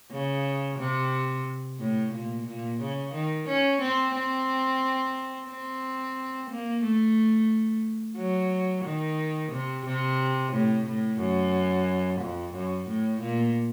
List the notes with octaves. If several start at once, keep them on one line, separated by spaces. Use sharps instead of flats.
C#3
C3
A2
A#2
A#2
C#3
D#3
C#4
C4
C4
C4
A#3
A3
F#3
D#3
C3
C3
A2
A2
F#2
F2
F#2
A2
A#2